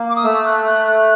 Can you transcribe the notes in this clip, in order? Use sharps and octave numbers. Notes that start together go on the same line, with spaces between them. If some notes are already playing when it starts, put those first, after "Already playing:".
Already playing: A#3
D6
D#6
A3 E6
F#6
F#6
F#6